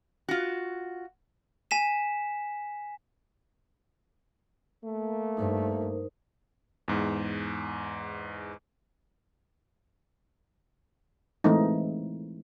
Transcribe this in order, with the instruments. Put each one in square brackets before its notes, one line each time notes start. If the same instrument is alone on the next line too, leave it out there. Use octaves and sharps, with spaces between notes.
[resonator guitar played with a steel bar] F4 F#4
[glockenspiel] G#5 B6 E7
[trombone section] A3 A#3
[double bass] G2 [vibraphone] D#4 A#4 C5
[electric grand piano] E2 G#2
[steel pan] E3 G#3 A3 C4 D#4